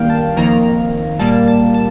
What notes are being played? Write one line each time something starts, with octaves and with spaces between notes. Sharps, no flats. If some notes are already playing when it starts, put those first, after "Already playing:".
Already playing: G2 D#3 A#3 F5 G5
A5
F2 D#3 A#3 A#5
A#2 G3 A#3 A5
A5
A5